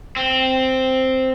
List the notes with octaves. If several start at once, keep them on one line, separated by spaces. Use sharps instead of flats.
C4